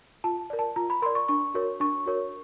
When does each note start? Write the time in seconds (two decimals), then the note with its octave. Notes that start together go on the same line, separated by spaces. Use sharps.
0.24 F4 A5
0.50 A#4 D5
0.59 A5
0.76 F4 A#5
0.90 B5
1.02 A#4 D5 C6
1.15 C#6
1.29 D4 C#6
1.54 F#4 A#4 C#5
1.80 D4 C#6
2.06 F#4 A#4 C#5